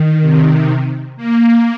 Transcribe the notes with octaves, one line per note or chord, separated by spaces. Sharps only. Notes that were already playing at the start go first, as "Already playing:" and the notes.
Already playing: D#3
C3
A#3